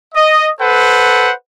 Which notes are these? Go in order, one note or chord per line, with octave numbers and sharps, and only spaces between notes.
D#5
A4 B4 C5 F#5